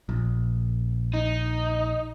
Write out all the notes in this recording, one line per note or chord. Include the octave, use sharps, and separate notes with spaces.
A#1
D#4